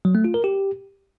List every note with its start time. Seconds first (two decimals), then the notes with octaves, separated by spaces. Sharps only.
0.05 F#3
0.15 A3
0.24 F4
0.34 A#4
0.44 G4